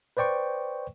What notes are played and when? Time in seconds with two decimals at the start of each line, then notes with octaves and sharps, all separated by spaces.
0.17 B4 C5 D5 G5 C#6